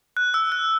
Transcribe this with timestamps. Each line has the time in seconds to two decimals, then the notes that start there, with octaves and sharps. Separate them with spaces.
0.17 F#6
0.34 E6
0.52 F#6